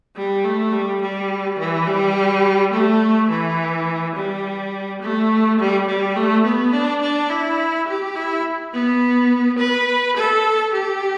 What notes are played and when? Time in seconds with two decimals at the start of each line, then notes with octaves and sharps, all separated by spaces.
0.16 G3
0.44 A3
0.73 G3
1.02 G3
1.59 E3
1.87 G3
2.74 A3
3.30 E3
4.16 G3
5.02 A3
5.59 G3
5.87 G3
6.16 A3
6.44 B3
6.73 D4
7.02 D4
7.30 E4
7.88 G4
8.16 E4
8.74 B3
9.59 B4
10.16 A4
10.73 G4